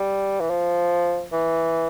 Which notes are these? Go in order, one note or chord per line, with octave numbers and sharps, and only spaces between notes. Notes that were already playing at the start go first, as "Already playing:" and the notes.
Already playing: G3
E3
F3
E3